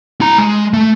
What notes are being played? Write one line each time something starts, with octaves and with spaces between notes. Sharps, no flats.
E4 A#5
G#3
A3